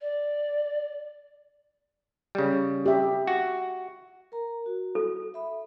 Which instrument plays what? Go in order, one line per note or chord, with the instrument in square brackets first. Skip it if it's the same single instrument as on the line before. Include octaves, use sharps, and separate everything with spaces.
[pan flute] D5
[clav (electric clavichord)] C#3 G3
[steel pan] G4 E5
[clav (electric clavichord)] F#4
[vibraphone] A#4 A#5
F#4
[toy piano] A4
[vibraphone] E5 B5